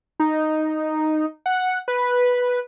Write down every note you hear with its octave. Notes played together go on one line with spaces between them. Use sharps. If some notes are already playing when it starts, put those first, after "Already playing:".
D#4
F#5
B4